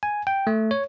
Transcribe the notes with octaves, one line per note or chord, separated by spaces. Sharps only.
G#5
G5
A3
C#5